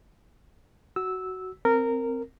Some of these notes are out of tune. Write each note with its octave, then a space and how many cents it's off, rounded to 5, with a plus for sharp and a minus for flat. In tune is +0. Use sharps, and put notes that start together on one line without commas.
F#4 +10 E6 -10
C4 +0 A#4 -15